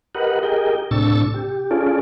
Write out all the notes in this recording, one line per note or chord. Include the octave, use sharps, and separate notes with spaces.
G4 A#4 B4 D#5 F#5
G4 G#4 A#4 D#5 G5
A2 C3 D4 C#6 E6 A6
G4
C#4 F4 G#4 A4 D5